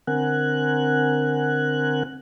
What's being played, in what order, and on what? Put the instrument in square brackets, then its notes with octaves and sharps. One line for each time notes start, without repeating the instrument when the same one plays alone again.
[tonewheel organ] D3 C4 A#4 F#5 G#5 F#6